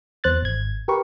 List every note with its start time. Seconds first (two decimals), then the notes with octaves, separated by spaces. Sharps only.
0.24 E2 C5 F#6 A6
0.42 G#1 G#6
0.88 G4 A#4 B4 C#6